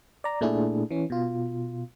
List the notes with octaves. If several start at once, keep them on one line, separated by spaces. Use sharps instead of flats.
D5 A#5
A#2 A3 D4 E4 G#4
E3 C#4
B2 F4